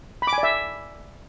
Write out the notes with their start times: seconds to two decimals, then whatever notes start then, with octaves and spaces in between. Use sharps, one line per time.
0.22 B5
0.27 D6
0.33 G#5
0.38 D5
0.43 E5